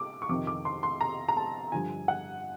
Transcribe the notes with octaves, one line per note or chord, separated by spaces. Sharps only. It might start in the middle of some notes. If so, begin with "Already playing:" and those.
Already playing: D6
C#6
F2 C3 D#3 D6
D6
C6
C6
A#5
A#5
A5
G2 D3 F3 G#5
F#5